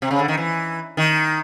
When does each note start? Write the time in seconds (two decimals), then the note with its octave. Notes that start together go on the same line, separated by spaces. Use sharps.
0.02 C3
0.11 C#3
0.19 D3
0.28 D#3
0.37 E3
0.97 D#3